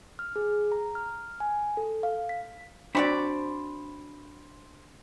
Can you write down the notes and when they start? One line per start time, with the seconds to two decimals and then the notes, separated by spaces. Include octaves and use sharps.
0.19 F6
0.36 G#4
0.72 A#5
0.95 F6
1.40 G#5
1.77 A4
2.03 F5
2.29 B6
2.95 C4 D4 F#4 C5 D5 B5